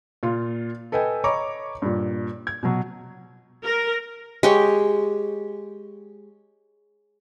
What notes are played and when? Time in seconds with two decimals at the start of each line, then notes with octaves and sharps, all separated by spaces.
0.23 A#2 F4
0.92 A4 B4 D#5 G5 G#5
1.24 C#5 D#5 A#5 B5 C#6 D6
1.82 G2 A#2
2.47 G#6
2.63 B2 F#3
3.63 A#4
4.43 G#3 G4 C#5